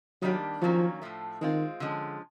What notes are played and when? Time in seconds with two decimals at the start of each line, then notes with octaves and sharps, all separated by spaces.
0.22 D#3 F#3 G3 A#3 D4 G4
0.62 D#3 F3 F#3 A#3 C#4
1.02 A2 F3 A3
1.41 D#3 G#3 C4 F4
1.80 D3 F3 G#3 C#4